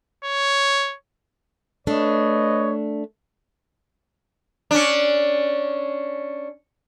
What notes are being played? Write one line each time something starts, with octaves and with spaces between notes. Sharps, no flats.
C#5
A3 D4 B4 C#5 D#5
C#4 D4